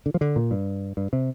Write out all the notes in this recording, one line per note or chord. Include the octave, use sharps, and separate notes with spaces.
D3
F3
D3
A#2
G2
G2
C3